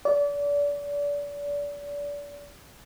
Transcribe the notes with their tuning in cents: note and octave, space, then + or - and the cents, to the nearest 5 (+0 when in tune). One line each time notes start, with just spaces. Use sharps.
D5 -30